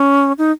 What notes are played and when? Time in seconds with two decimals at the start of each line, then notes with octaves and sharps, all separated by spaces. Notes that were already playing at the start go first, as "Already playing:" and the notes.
Already playing: C#4
0.38 D#4